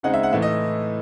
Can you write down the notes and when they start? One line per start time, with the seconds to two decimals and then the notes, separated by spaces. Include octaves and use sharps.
0.03 C#3 G#3 C4 D#4 F#5
0.14 E5
0.23 F#5
0.32 A2 E3 A3 D#4 E5
0.42 D#5